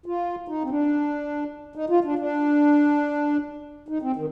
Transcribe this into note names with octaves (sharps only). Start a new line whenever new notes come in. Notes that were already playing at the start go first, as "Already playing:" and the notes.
F4
D#4
C4
D4
D#4
F4
D4
D4
D#4
C4
D#3